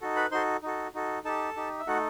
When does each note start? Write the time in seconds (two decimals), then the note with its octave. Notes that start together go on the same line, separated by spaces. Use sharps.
0.01 D#4 F#4 A4
0.16 B4 B5
0.31 D#4 F#4 A4 C5 C6
0.62 D#4 F#4 A4
0.94 D#4 F#4 A4
1.25 D#4 G4 A4 A5
1.56 D#4 G4
1.79 E5
1.87 A3 D#4 F#4 A4 F#5